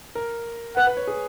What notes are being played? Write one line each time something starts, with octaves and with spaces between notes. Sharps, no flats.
A#4
B4 F#5
B4
C#5
G#4